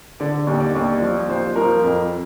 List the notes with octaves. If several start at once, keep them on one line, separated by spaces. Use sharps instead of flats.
D3 D5
D#2
D5
D#2
F3
D#2 C5
F3 A#4
F2